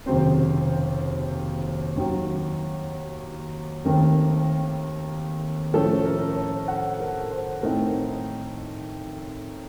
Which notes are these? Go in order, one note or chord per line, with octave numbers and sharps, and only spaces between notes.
F1 D#2 C#3 F#3 C4 C5
D#2 D#3 F#3
D#2 D#3 A3 C4 A#4
A2 F3 A3 C#4 A4
A#4
C#5
F#5
A#4
C5
A2 A3 C4 D#4 A#4